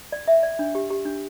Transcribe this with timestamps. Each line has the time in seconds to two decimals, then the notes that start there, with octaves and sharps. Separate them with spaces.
0.12 D5
0.28 E5
0.43 D5
0.59 D4
0.75 G4
0.90 G4
1.05 D4